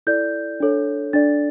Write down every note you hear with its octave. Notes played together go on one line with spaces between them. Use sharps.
E4 A4 D5 G6
D4 A4 C#5
D4 A4 D5 A6